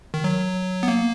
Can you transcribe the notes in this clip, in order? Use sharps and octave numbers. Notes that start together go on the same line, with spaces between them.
D#3
F#3
B3
A#3